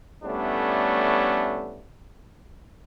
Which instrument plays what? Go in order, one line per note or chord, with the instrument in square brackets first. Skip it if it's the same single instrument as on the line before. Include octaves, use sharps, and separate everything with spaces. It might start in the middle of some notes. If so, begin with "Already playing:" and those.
[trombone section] A2 G3 A3 B3 C#4 D4